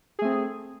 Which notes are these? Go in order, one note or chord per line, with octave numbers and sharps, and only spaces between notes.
A3 C4 G#4